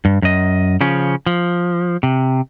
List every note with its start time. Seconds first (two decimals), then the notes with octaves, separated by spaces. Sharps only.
0.05 G2
0.22 F#2 D#5
0.81 C#3 F3 C#4
1.26 F3
2.03 C3